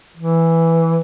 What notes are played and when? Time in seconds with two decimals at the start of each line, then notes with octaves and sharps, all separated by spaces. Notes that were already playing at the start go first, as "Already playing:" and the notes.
0.17 E3